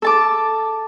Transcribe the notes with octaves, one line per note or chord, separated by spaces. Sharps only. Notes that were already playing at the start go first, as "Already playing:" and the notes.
A4 A5 D6